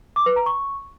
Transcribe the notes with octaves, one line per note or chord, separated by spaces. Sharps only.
D6
B4
A#5
C#6